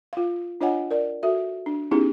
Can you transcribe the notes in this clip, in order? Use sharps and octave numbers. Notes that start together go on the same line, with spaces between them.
F4 F5
D4 F4 C#5 D#5 F#5 G#5
A#4 D5
F#4 A4 E5
D4
B3 C#4 D#4 E4 G4 G#4